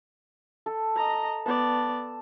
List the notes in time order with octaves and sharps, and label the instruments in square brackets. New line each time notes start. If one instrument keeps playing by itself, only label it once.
[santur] A4
[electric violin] D#5 A#5
[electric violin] B3 D5 [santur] A5